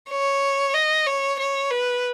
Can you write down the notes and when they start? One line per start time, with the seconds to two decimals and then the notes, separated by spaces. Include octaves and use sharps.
0.10 C#5
0.75 D#5
1.07 C#5
1.39 C#5
1.71 B4